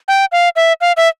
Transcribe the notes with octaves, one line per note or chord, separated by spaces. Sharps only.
G5
F5
E5
F5
E5